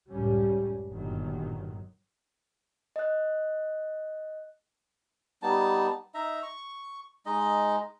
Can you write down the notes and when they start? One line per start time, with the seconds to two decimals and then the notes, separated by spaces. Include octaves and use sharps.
0.10 F#1 C#2 F#2 A2 G3 C#4
0.89 G1 A#2 D#3 F#3
2.96 D#5 F#6
5.42 G3 B3 D#4 A5
6.14 D#4 E5 A#5
6.43 C#6
7.26 G#3 D#4 D#5